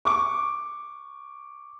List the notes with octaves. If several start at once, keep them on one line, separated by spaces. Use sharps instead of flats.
C#6 D6